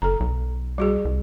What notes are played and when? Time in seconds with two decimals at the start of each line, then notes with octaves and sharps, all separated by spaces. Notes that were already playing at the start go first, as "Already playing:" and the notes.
0.02 F#1 A4 A#5
0.20 B1
0.78 G3 F#4 G#4
1.05 C2